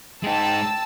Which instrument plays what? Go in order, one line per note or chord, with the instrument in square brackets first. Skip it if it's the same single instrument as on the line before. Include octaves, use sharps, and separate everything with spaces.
[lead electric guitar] G#3 D#4 [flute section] G5 [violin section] A5 E6